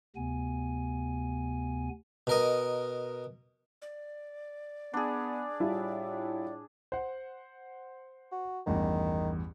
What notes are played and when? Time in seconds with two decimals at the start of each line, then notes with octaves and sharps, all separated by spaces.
0.16 D2 C3 B3 G#5
2.27 B2 A#4 D#5
3.82 D5
4.94 B3 D4 G#4
5.60 A2 G3 E4 F4
6.92 C5 F#5
8.32 F#4
8.67 A1 E2 G2 D#3